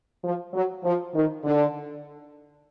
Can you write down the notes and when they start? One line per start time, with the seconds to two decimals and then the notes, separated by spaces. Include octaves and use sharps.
0.24 F3
0.54 F#3
0.84 F3
1.14 D#3
1.44 D3